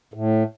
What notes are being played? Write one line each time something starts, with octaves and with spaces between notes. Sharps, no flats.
A2